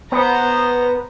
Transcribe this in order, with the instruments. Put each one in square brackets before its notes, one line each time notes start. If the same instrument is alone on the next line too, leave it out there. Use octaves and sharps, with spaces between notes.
[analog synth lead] B3 [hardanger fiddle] C5 A#5